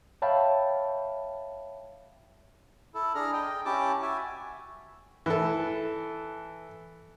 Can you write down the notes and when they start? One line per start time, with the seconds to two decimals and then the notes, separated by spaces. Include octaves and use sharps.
0.22 C#5 E5 F5 G5 A5 B5
2.95 E4 A4
3.15 D4 G#4 A#5 F6
3.33 D#5 G5
3.65 C#4 E4 G4 A5 D6
4.02 F#4 E5 G#5
5.26 E3 A4